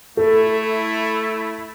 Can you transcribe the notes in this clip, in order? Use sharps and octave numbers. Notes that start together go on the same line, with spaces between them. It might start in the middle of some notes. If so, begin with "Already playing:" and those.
A3 E4 A4